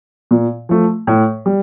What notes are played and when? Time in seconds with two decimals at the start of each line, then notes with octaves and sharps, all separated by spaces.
0.31 A#2
0.69 F3 A3
1.07 A2
1.46 G3